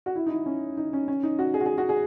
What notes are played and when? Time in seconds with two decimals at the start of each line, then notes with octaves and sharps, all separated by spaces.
0.06 F#4
0.15 E4
0.26 D#4
0.31 E4
0.46 C#4
0.77 D#4
0.93 C#4
1.08 C#4
1.23 D#4
1.39 F#4
1.54 G#4
1.60 F#4
1.66 G#4
1.78 F#4
1.89 G#4